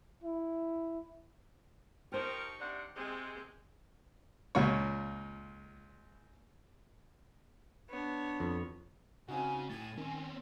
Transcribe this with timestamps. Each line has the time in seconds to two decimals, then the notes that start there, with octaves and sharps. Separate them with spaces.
0.24 E4
2.12 F3 D#4 G4 A#4 C5 C#6
2.59 C3 D4 F#5
2.96 C3 G#3 C4 G#4
4.55 C#2 A#2 C#5
7.90 B3 D4 C#5
8.40 F2
9.28 C#3 C4 D#4 F#4 G#5
9.70 A2 G#5 A6
9.98 D#3 C4 C#4